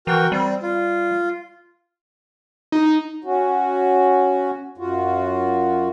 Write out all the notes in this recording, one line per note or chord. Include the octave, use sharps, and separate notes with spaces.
E3 F#4 A#4 G5
G3 C4
F4
D#4
C#4 F#4
F#2 F4 F#4